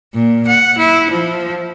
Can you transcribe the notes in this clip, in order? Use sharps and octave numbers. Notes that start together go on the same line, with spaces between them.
A#2
F#5
E4
F3